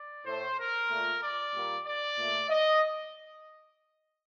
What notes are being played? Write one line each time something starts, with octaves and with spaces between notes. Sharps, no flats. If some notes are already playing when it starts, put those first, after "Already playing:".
Already playing: D5
A2 A3 C5
A#4
A#2 A3
D5
A#2 G3 A#3
D5
A#2 A3
D#5